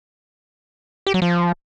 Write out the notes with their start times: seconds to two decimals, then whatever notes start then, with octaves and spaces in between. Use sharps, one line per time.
1.07 G4
1.14 F#3
1.22 F3